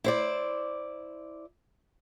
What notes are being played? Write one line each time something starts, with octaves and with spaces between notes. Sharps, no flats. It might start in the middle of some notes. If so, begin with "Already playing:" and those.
E4 C5 D5